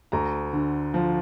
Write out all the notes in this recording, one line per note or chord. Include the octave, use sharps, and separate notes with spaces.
D2 A#5
D3
F3